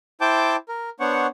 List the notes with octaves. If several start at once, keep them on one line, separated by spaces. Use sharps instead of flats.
E4 C5 G5 A5 D6 G6
A#4
B3 D4 C5 C#5 F#5 C#6